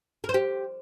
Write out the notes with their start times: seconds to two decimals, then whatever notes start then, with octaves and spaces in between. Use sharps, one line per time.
0.24 A#4
0.29 C5
0.34 G4